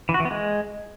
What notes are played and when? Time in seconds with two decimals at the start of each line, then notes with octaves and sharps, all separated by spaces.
0.09 E3
0.14 F#4
0.20 E3
0.25 B3
0.31 G#3